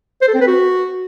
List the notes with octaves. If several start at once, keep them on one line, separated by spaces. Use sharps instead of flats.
C5
A4
C4
B4
F#4